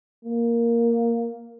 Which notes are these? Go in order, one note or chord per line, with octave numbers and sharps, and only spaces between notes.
A#3